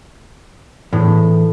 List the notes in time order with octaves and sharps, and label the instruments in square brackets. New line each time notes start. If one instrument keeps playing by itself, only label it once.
[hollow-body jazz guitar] E2 [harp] A2